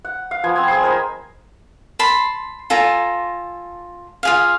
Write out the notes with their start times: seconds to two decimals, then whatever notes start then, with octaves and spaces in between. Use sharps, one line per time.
0.05 F#5
0.31 F5
0.44 F3 B3 G#5
0.56 C4 G#5
0.68 G#4 C6
0.83 A#4 C5 D#5 B5
1.99 A5 B5 C6
2.70 F4 A4 G#5 A#5
4.23 F4 G#4 F5